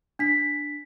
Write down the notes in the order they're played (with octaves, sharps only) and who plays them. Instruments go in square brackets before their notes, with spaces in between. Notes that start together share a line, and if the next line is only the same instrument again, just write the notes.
[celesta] D4 B6